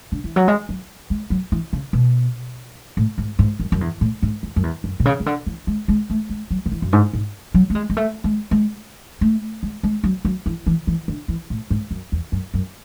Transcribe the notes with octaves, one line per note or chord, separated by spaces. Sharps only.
D3
E3
F#3
G#3
F#3
G#3
F#3
E3
C#3
B2
A2
G#2
G#2
F#2
F#2
E2
A2
G#2
E2
F#2
E2
F#2
B2
C#3
C#3
D3
E3
G#3
G#3
A3
G#3
F#3
D3
E3
F#2
G#2
G#2
F#3
A3
G#3
G#3
A3
G#3
G#3
A3
G#3
G#3
F#3
F#3
E3
E3
E3
D3
E3
A2
G#2
F#2
E2
F#2
F#2